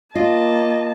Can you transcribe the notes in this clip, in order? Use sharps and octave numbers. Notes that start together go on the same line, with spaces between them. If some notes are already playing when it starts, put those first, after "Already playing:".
A#3 F4 D#5 A5